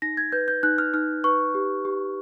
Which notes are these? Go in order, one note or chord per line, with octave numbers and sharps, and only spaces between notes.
D#4 A#6
G#6
B4 G6
G6
D#4 F#6
F6
D#4 F6
B4 C#6
G4
G4